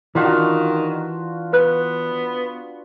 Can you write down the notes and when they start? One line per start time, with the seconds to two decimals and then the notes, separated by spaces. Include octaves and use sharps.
0.15 D#3 E3 D4 F4 F#4
1.53 B3 B4 F#6